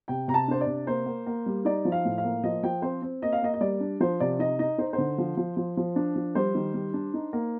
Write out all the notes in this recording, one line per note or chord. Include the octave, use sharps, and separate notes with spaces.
C3 G5
C3 A#5
A5
D4 C5
D5
C3
A#3 C5
A#3
A#3
G3
D#4 D5
F3
F5
A2
F5
A#3
F3 D#5
F3 G5
C4 C5
C4
A#3 D#5
F5
A#3 D#5
D#5
G3 D5
D4
F3 C5
C3 D5
D#4 D#5
D#4 D#5
D#4 C5
C5
D3
F3
F3
F3
F3
D4
F3
G3 C5
D#3
G3
D4
D#4
A#3